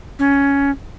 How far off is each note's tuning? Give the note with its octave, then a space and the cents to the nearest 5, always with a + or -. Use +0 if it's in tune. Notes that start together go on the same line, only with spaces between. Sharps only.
C#4 +10